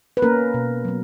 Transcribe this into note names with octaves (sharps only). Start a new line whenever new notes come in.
B4
A#3 C#4 A#4
B2
F#3 B3